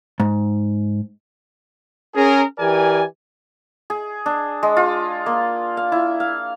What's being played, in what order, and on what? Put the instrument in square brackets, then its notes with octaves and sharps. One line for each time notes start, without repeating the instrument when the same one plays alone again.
[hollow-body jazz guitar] G#2
[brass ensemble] C#4 G#4 A#4
E3 G4 A#4 D5 G#5
[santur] G#4
D4
G#3
F4
A#3
F5
E4
F5